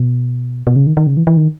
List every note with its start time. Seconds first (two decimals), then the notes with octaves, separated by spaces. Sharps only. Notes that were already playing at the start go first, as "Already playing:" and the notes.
Already playing: B2
0.67 B2
0.76 C#3
0.87 D#3
0.97 D#3
1.07 C#3
1.17 E3
1.27 E3
1.37 D#3